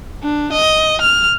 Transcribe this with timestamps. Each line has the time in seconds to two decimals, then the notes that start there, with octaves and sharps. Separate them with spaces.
0.23 D4
0.52 D#5
1.01 F6